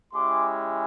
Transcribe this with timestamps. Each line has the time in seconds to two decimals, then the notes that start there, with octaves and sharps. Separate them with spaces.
0.13 G#3 C#4 E4 G4 C6 D6